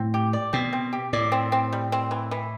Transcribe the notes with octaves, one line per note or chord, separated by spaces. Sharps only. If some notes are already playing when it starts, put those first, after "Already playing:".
Already playing: A2 C4
G4
D5
B2 C4
C4
G4
A2 D5
C4
C4
G3
C4
E3
E3